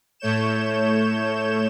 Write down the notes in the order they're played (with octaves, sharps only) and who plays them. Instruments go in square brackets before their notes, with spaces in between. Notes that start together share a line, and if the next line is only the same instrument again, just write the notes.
[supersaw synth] A2 A3 C#5 G6 E7